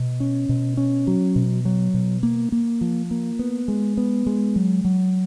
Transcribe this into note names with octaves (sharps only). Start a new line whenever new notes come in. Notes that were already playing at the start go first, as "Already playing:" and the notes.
Already playing: B2
C#4
B2
C#4
F#3
B2
F#3
B2
A#3
A#3
F3
A#3
B3
G#3
B3
G#3
F#3
F#3